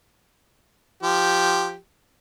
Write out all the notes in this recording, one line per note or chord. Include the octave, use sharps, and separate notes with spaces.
F3 G4